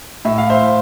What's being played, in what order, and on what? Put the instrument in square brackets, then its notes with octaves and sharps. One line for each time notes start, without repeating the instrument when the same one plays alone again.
[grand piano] A2 E5
F5
C5 E5